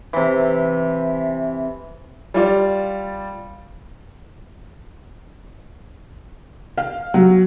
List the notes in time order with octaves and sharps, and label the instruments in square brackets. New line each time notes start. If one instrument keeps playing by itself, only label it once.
[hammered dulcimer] C3 E3
[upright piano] G3 F4 D5
[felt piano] F5
F#3